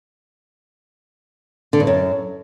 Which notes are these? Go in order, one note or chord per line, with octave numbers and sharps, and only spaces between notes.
D3
G2
F#2